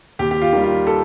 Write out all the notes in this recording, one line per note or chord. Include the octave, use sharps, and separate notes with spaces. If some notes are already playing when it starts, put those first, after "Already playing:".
D#2 G4
G4
F4
D#3 G3
F4
A4